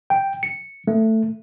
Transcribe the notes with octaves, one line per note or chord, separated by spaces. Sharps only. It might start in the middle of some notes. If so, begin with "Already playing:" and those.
G5
C#7
A3